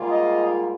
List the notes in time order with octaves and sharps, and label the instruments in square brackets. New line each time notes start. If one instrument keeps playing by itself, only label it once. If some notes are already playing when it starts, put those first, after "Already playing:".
Already playing: [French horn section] G#2 G3 A#3 F4 G#4
[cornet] D#5